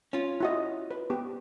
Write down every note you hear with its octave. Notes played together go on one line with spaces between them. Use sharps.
C#4 F4
E4 F#4 D#5
B4
B3 G4